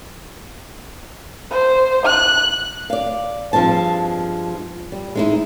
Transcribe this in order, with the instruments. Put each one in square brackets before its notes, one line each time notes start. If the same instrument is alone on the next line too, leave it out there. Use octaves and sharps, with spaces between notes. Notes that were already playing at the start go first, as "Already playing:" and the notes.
[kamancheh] C5
F#6
[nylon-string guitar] D5 F5
G2 F3 G#3 C4 A5
G3
G#3 D#4 E4